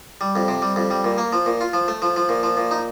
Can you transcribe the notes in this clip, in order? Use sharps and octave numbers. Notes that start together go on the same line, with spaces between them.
G3
F2
C3
G3
F2
G3
A#2
A#3
F3
A#2
F4
F3
A3
F3
F3
A#2
F3
A#2
D#4